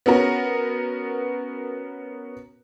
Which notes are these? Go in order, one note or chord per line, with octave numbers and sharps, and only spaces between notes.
B3 C#4 F#4 A#4